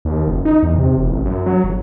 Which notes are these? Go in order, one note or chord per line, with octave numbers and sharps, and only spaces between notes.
D#2
F#1
D#4
E2
C3
F1
A1
F#2
F#3
G1